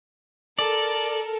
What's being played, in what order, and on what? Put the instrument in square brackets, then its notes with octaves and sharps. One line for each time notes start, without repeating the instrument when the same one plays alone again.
[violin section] A4 A#4 [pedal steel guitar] D5